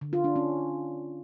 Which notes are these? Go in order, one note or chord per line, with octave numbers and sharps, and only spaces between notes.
D3
F4
D4
C#4